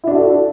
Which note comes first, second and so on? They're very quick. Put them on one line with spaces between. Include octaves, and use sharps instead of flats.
E4 D4 F#4 A4